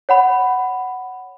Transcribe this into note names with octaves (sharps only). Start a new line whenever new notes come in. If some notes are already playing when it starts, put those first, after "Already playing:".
C#5 F#5 B5